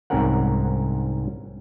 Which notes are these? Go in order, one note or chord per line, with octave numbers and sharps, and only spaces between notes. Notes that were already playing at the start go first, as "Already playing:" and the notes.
C2 G#2 C4 C#4 A#4 F#5